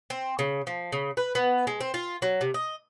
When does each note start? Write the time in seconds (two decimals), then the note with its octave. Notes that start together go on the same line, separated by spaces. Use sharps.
0.10 C4
0.39 C#3
0.67 F3
0.92 C#3
1.17 B4
1.35 B3
1.67 G#3
1.81 C4
1.94 F4
2.22 F#3
2.41 C3
2.54 D#5